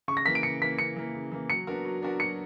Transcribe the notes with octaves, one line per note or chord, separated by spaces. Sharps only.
C#3 C#6
A#6
E3 A#3 B6
D7
C#3 C#7
E3 A#3 B6
C#3 C#7
E3 A#3
C#3
E3 A#3
F#3 C#7
B3 D4 F#4 A#4
F#3
B3 D4 F#4 A#4
F#3 C#7